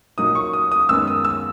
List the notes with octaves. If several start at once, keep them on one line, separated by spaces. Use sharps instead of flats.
A#2 F#3 A#3 D#4 D#6
C#6
D#6
D#6
F#2 D#3 G#3 B3 D#4 E6
D#6
E6